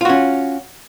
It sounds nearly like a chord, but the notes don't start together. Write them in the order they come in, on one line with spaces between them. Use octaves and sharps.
F4 F#4 C#4